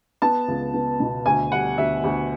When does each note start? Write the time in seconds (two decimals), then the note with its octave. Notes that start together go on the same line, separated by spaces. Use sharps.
0.22 B3 A5
0.48 C#2
0.74 B3
1.00 B2
1.26 D2 G#5
1.52 G3 F#5
1.78 D2 E5
2.04 D2